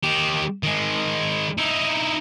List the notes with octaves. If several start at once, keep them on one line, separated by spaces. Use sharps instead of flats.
D#3 G4
D#3 G#3
D#4 E4